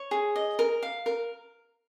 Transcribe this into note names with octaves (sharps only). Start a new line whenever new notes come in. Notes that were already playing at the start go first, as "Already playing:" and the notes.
Already playing: C#5
G#4
D#5
A#4
F5
A#4